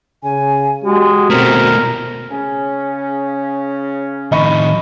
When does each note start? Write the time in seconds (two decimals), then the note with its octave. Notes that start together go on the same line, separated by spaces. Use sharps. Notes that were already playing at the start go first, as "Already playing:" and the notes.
0.24 C#3 G#5
0.84 G#3 F#4 G4
1.30 B2 A3 C4 A#4
2.31 C#3 C#4
4.32 A2 D#3 D#5 B5 C#6